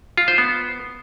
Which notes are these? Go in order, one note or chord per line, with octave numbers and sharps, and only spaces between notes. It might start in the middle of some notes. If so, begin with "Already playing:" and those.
F4
C5
B3